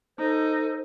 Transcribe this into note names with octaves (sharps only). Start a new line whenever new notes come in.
D#4 A4 C5